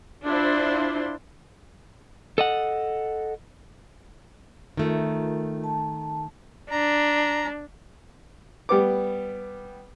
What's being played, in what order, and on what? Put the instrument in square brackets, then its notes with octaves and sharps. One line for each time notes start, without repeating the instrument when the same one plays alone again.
[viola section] D4 E4 F4 C5
[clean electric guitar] A4 D#5 F#5
[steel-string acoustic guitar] D#3 A3 [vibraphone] F4 A#4
[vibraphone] A5
[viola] D4 [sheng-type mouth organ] A#5
[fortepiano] G3 B3 D6